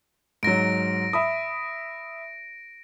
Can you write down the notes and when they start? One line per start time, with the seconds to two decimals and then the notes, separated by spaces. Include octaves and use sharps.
0.43 G#2 F#3 A#6 D7
1.13 E5 B5 D#6